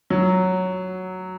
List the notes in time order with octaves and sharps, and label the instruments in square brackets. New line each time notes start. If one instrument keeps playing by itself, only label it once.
[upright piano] F#3